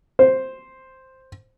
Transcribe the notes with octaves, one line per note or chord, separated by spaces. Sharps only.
C5